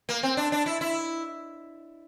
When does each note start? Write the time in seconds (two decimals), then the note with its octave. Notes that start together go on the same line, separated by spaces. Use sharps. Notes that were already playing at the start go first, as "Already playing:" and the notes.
0.09 A#3
0.23 C4
0.37 D4
0.52 D4
0.66 E4
0.81 E4